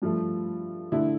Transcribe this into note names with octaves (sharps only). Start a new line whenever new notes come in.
G2 F3 A3
D3 A3 E4